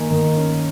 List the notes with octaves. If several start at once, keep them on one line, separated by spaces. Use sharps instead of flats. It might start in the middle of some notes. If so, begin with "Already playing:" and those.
Already playing: D#3 A#3 G#5
D#3
C#4